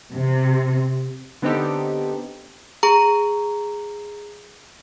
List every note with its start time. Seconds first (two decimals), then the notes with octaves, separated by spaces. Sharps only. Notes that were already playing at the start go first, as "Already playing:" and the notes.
0.13 C3
1.42 D3 B3 C4 D#4 G4 A4
2.83 G#4 A#5